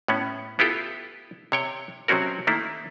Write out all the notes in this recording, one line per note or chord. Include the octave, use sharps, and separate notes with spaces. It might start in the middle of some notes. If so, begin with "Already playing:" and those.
A2 B3 C#4
B3 E4 F4 G4 A4
C3 C#5 G5
C3 F#3 C4 C#4 F#4 A#4
D#3 A3 A#3 E4